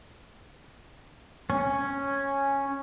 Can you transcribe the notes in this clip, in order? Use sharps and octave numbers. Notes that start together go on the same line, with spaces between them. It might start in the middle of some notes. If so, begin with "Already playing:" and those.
C#4